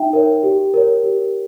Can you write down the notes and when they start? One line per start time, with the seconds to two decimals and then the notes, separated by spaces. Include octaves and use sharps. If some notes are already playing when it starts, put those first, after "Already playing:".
Already playing: D#4 E5 G5
0.13 A#4 C#5
0.43 G4
0.74 A#4 C#5
1.04 G4